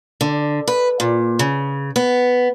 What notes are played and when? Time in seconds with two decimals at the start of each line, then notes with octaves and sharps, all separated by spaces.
0.21 D3
0.68 B4
1.00 A#2
1.39 C#3
1.96 B3